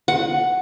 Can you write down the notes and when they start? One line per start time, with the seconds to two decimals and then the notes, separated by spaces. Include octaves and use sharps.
0.08 F#5